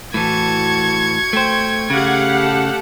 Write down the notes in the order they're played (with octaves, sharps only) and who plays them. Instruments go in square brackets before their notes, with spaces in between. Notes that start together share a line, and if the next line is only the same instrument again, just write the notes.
[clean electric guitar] A2 E3 [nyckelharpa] F#4 A5 [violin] C#6 G#6
[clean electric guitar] A3 C5 [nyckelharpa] G5
[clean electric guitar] C#3 [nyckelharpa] A3 F5 [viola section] G4 F#5
[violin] A4